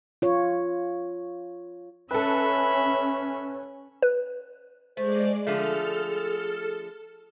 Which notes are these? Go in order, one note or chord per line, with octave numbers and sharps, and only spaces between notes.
F4 C#5
C#4 A4 B4 E5 B5
B4
G#3 A3 C5 D5
D3 F3 A3 G#4 A4 F6